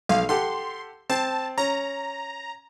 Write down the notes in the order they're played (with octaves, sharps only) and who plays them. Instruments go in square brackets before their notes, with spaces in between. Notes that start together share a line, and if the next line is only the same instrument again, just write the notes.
[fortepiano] B1 [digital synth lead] F5
[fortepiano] G4 A4 F#5 [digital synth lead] C6
[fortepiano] C4 [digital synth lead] A5
[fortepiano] C#4 [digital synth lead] A#5